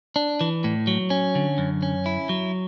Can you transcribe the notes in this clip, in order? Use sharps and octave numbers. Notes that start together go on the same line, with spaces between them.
D4
E3
A2
F#3
C#4
D3
F#2
C#4
E4
F#3